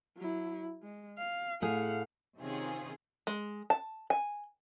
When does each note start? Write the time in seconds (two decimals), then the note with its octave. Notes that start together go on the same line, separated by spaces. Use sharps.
0.17 F#3 E4
0.83 G#3
1.18 F5
1.62 A2 G#4 F5 F#5
2.39 C3 D#3 C4 C#4 F4 G#4
3.27 G#3
3.70 A5
4.10 G#5